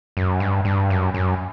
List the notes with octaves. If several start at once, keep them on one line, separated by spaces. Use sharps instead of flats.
F#2
G2
G2
F#2
F#2